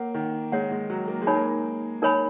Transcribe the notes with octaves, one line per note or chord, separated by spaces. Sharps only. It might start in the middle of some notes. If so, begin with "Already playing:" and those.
Already playing: A#3 A#4 C#5 F#5
D#3
G#3 A#4 C#5 F#5
G#3
F#3
A#3
G#3
D#4 A#4 C#5 G#5 B5
A#3
D#4 A#4 C#5 G#5 B5